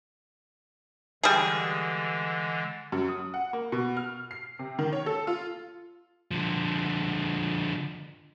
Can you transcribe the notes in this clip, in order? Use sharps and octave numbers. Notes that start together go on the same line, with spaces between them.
D3 E3 G3 G#3 G#4
F#2
D#6
F#5
A#3
B2
F6
C7
C3
D#3
C#5
A4
F4
D3 F3